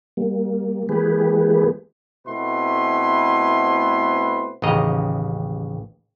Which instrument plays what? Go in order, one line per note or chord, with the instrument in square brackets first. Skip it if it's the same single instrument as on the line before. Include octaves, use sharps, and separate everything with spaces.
[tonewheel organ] G3 A#3
E3 G#3 A#3 G4 G#4 B4
[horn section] B2 A3 C4 E4 B4 C6
[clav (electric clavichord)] A1 D#2 C#3 D#5 A#5